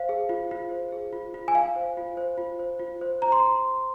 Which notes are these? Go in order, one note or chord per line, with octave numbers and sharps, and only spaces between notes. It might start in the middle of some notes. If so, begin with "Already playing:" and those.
Already playing: C5 F5
G#4
F4
F4
C5
G#4
F4
F4
G#5
F4 F5
C5
F4
C5
F4
C5
F4
C5
C5 A#5
C6